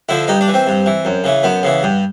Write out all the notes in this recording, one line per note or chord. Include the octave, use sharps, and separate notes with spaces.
D3 F3 E4
G2 D#4
D4
E3
C4
G2
E3
F#2
C#3 E3
F#2 B3
C#3 E3
G2